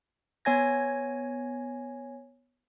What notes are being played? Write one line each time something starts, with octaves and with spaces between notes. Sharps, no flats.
B3 C#5 G#5 G#6 A#6